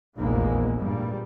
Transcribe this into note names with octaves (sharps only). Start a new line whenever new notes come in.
F1 A#1 E2 F3 G#3 A#3
G#1 G2 A#2 G3